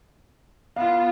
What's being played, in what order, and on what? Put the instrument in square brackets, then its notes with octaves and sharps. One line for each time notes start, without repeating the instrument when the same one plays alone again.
[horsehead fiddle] B3 F4 [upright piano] F5